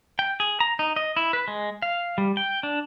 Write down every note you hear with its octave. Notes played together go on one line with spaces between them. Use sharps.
G5
G#4
A#5
D#4
D#5
E4
B4
G#3
F5
G3
G5
D4